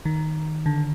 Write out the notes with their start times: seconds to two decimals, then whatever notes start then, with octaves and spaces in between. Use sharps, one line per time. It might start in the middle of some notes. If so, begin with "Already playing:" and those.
0.05 D#3
0.66 D3